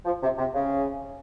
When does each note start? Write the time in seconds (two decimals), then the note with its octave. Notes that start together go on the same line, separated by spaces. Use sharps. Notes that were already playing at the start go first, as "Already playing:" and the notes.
0.05 F3
0.22 C3
0.38 C3
0.54 C#3